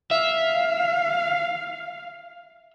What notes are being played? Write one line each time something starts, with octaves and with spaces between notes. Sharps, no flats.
E5 F5